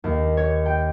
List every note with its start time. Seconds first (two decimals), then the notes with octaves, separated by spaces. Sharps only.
0.04 D#2
0.37 C#5
0.66 G5